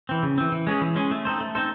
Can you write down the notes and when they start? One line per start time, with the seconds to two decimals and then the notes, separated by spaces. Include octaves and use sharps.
0.09 E3 C4
0.23 C#3
0.38 E3 C4
0.52 E3
0.67 G#3 C#4 G#4
0.81 E3
0.96 G#3 C#4 G#4
1.11 A3
1.25 C4 D#4 A4 C5
1.40 A3
1.55 C4 D#4 A4 C5